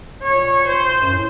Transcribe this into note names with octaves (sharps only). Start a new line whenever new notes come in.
A#2 C#5
C5
F#2
A2